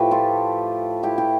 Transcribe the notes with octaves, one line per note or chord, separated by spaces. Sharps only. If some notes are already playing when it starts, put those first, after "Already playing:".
Already playing: A2 F3 A3 G4 B4
F4 A4
E4 G4
E4 G4